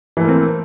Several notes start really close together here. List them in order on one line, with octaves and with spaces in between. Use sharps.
E3 A3 A#3 C4